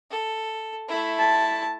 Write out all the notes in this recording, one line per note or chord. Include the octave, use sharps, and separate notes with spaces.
A4
A3 E4
A5